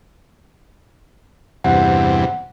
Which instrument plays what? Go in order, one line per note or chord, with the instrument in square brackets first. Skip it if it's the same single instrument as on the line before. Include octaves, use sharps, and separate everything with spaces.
[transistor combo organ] E2 G2 C3 [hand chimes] F#5